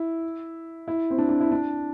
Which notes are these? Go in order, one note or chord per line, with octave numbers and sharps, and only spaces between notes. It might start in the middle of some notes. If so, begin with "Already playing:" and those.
Already playing: E4
E4
C4
D4
D4
E4
D4